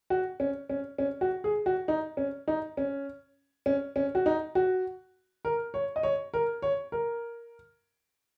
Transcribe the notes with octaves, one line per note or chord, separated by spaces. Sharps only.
F#4
C#4
C#4
C#4
F#4
G#4
F#4
D#4
C#4
D#4
C#4
C#4
C#4
F#4
D#4
F#4
A#4
C#5
D#5
C#5
A#4
C#5
A#4